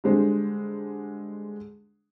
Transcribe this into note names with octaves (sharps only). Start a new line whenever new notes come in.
D3 G3 G#3 C5